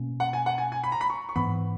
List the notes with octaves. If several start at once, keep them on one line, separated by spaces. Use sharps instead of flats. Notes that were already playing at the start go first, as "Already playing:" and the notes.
Already playing: B2 A#3 C#4
F#5
G#5
F#5
G#5
G#5
B5
A#5
B5
C#6
C#6
G#2 E3 B3 B5